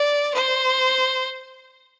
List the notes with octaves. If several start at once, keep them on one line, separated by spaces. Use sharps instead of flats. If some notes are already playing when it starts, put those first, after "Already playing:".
Already playing: D5
C5